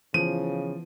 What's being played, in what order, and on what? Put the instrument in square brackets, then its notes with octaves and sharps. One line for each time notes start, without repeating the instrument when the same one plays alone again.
[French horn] C#3 [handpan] E3 B3 [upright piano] F3 [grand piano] D#7